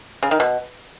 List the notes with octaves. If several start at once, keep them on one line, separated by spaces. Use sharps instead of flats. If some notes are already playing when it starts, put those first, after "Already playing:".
C#3
D#3
B2